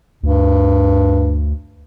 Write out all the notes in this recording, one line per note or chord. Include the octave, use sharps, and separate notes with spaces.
D2 G2